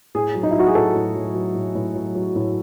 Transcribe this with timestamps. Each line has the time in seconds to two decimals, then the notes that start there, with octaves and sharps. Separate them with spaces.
0.15 A2 G#4
0.35 F#3
0.43 D#4
0.51 E4
0.55 F#3 F#4
0.67 G#4
0.75 A2 A4
0.95 A2
1.15 F#3
1.35 F#3
1.55 A2
1.75 A2
1.95 F#3
2.15 F#3
2.36 A2